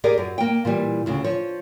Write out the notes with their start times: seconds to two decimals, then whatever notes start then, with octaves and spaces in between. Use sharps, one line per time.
0.04 G4 G#4 A#4 D5
0.18 F#2
0.38 A#3 G5
0.65 A#2 E3 G3
1.06 D2 C#3
1.24 F3 C#5